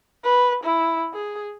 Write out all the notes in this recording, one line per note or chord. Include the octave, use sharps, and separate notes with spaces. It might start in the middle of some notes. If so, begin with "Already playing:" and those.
B4
E4
G#4